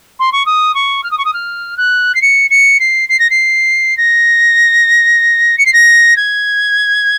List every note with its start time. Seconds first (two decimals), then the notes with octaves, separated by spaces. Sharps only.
0.19 C6
0.32 C#6
0.46 D#6
0.74 C#6
1.03 F6
1.11 D#6
1.18 C#6
1.25 D#6
1.33 F6
1.77 F#6
2.15 C7
2.22 C#7
2.50 C#7
2.80 C7
3.09 C7
3.19 A#6
3.30 C7
3.97 A#6
5.58 C#7
5.66 C7
5.73 A#6
6.16 G#6